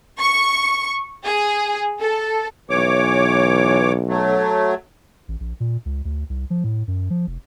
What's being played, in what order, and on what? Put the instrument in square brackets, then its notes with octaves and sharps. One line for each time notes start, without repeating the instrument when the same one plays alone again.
[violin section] C#6
G#4
A4
[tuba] B1 [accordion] E3 C#5 D6
[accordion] F#3 A3
[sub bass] A1
A#1
A#2
C#2
D2
C2
F3
A2
F#2
F3
F1